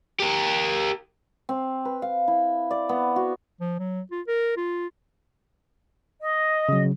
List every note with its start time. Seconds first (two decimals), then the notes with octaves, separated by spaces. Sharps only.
0.20 G4 A#4
1.49 C4
1.85 B4
2.02 F5
2.28 E4
2.71 D5
2.89 B3
3.16 F#4
3.61 F3
3.79 F#3
4.11 F4
4.28 A#4
4.57 F4
6.20 D#5
6.69 C#3 F#3